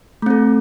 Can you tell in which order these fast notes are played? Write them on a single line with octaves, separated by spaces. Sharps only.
A3 C4 A4